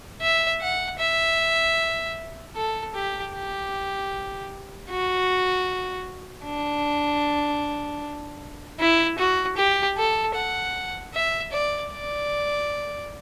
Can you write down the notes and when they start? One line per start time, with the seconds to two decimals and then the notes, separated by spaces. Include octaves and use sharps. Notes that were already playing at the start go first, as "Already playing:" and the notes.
0.21 E5
0.61 F#5
0.99 E5
2.56 A4
2.94 G4
3.34 G4
4.89 F#4
6.45 D4
8.80 E4
9.18 F#4
9.57 G4
9.97 A4
10.35 F#5
11.14 E5
11.52 D5
11.92 D5